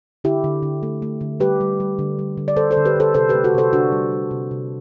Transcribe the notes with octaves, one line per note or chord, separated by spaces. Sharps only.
D3 E4 G4
D3
D3
A3
A3
D3
G3 G4 B4
G3
G3
D3
G3
D3
D5
D3 A4 C5
A4 C5
D3
G4 B4
D3 A4 C5
C3 A4 C5
G4 B4
A3
F#4 A4
C3 A4 C5
D3 D4 F#4
G3
G3
C3
C3